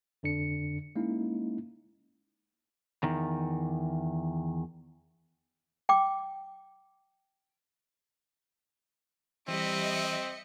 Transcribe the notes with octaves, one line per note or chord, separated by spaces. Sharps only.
F2 D3 D4 C#7
G#3 A#3 C#4 D#4 E4
E2 D#3
G5 D6
E3 G3 C4 D#5 E5 C#7